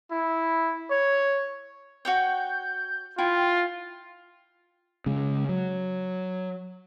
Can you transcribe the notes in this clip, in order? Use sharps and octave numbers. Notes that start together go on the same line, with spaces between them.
E4
C#5
F#4 C#5 G5 G6
E4 F4 G5
C#3 G#3
F#3